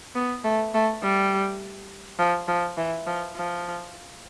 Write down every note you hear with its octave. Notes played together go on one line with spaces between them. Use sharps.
B3
A3
A3
G3
F3
F3
E3
F3
F3